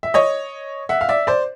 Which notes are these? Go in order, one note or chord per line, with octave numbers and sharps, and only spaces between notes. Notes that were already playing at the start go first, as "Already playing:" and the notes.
E5
C#5 D#5
E5 F#5
F5
D5 E5
C5 D5